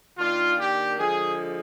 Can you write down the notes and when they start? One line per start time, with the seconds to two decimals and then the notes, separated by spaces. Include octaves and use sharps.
0.18 D#3 A#3 D4 F4
0.58 G4
0.99 D3 F3 G#3 G#4